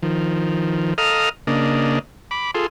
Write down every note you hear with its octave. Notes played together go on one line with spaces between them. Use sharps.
D#3 F3
A4 D#5 F5 A#5 D#6 F6
C#3 A#3 D4 D#5
B5 D6
F4 G#4 A4 C6